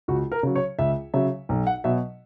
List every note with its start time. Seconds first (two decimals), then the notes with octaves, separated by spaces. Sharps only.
0.08 C#2 F#4
0.32 A#4
0.43 C#3 F#3
0.56 C#5
0.79 C#2 E5
1.14 C#3 F#3 E5
1.49 B1
1.67 F#5
1.84 B2 F#3 E5